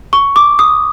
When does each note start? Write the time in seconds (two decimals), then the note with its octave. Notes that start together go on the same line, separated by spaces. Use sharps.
0.13 C#6
0.36 D6
0.59 D#6